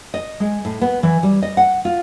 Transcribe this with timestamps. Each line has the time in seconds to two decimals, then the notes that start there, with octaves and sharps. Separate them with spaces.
0.14 D#5
0.40 G#3
0.65 A2
0.81 B3
1.03 E3
1.23 G3
1.43 D#5
1.57 F#5
1.85 F4